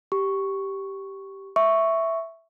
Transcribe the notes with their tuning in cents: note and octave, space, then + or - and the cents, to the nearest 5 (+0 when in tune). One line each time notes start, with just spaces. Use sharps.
G4 -5 C#6 +0
E5 +0 C#6 +0